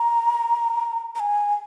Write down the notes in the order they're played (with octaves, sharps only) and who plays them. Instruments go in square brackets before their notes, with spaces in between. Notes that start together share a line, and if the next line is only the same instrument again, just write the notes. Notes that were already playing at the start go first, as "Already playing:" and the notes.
Already playing: [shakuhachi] A#5
A#5
G#5